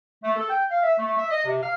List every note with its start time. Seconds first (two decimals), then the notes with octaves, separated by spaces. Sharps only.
0.24 A3
0.36 A4
0.50 G5
0.70 F5
0.83 E5
0.98 A3
1.18 E5
1.30 D#5
1.45 C3
1.62 F5